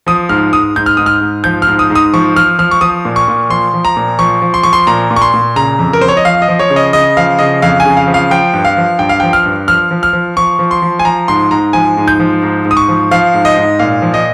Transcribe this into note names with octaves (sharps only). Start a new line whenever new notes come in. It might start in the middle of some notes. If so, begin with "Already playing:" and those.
F3 D#6
G#2 F6
G#2 D#6
G#2 G6
F6
G#2 D#6
F6
G#2
F3 G6
F6
G#2
D#6
G#2
D#6
F3 C#6
F3 F6
F3 F6
C#6
F3 D#6
A#2
C#6
A#2
F3 C6
F3
A#5
A#2
F3 C#6
F3
C6
F3 C#6
C6
A#2 A#5
A#2
C#6
C6
A#2
C#3 A#5
F2
A#4
F2 C5
C#5
D#5
F3 F5
D#5
F3
C#5
C#3
D#5
C#3 D#5
F3 F5
C#3 D#5
F2 F5
G#5
C#3
F5
F3
F5
F3 G5
G2
F5
F3
G2 G5
F5
F3 G5
F6
G2
F3 F6
F3
F6
F3
F3 C#6
F3
C6
F3
G#5
F3 A#5
G#2 C6
G#2 A#5
F3 G#5
G#2
G6
F3
G#2
G#2
D#6
C#6
F3
F3 F5
G#2
D#5
G#2
A#2 F5
F3
D#5